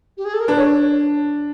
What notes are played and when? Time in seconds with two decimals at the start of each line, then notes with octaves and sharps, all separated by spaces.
0.17 G4
0.25 G#4
0.34 A4
0.40 A#4
0.48 D4 B4
0.57 C#5